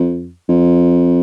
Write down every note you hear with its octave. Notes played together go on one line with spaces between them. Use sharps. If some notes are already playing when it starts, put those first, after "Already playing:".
Already playing: F2
F2